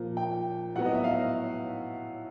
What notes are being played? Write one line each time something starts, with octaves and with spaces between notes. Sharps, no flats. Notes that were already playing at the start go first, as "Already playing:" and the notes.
Already playing: A#2 F3 A#3
G5
A2 F#3 B3 F#5
D#5
E5
F5